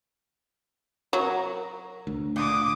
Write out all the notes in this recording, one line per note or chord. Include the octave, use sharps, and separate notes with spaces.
F#3 A#4
D2
A#2 D3 D6 D#6